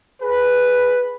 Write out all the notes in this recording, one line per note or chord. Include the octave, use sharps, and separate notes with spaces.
G#4 B4